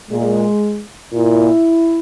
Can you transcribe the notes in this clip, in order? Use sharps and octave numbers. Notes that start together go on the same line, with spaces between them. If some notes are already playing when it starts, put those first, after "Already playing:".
A#2 G#3
A#2 E4